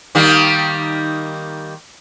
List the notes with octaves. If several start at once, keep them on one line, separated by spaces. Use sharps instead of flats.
D#3 G3 A#3